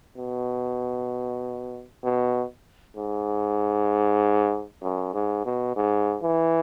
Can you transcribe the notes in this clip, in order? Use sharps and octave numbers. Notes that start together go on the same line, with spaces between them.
B2
B2
G#2
F#2
G#2
B2
G#2
E3